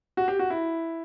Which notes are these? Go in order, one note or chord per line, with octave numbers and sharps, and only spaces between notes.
F#4
G4
F#4
E4